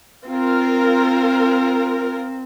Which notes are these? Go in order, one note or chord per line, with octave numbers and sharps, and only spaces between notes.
C4 F4 A#4